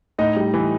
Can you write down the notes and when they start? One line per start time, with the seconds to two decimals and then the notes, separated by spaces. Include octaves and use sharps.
0.18 A2 D#4 D#5
0.36 G3
0.54 E3